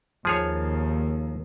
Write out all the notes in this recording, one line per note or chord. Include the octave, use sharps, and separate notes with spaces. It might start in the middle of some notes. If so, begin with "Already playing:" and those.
D#2 F3 G#4 C#5